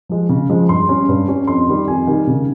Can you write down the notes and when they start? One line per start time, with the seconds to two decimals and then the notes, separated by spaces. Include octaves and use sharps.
0.09 F3 G#3
0.29 C#3
0.49 F3 G#3
0.69 G2 C6
0.89 G3 C#4
1.08 G2
1.28 G3 C#4
1.47 F2 C6
1.68 D#3 G3
1.88 F2 G#5
2.07 D#3 G3
2.27 C#3